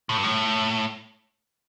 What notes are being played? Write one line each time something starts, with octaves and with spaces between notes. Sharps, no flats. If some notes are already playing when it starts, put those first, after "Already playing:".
A2
G2
A2